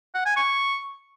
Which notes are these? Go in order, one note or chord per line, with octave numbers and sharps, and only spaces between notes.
F#5
G#5
C#6